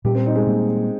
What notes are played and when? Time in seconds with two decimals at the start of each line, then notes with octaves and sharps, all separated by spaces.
0.04 A#2 G3 A#3 C#4 G4
0.15 C4
0.26 D#4
0.36 G#3
0.46 A#2 G3 A#3 C#4